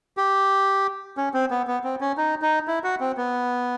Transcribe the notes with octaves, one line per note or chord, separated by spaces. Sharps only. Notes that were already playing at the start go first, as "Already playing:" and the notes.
G4
C#4
C4
B3
B3
C4
C#4
D#4
D#4
E4
F#4
C4
B3